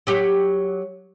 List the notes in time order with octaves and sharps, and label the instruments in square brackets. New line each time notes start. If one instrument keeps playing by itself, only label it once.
[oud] F#3 G4 C#5